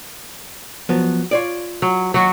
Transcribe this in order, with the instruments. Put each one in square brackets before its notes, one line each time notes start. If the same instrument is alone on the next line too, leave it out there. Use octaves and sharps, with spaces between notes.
[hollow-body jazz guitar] F3 F#3 B3
F4 C#5 D5
[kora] F#3
[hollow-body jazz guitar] D#2 [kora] F#3 F#4